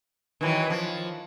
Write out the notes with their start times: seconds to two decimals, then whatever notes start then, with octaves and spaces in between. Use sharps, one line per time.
0.41 D#3 E3 F#3
0.70 F3